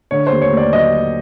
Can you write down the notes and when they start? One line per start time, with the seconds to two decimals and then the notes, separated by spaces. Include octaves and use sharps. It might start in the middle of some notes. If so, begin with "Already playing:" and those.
0.11 D3 C#5
0.27 C5
0.32 D#2
0.42 C#5
0.52 D#2 D5
0.73 F#3 D#5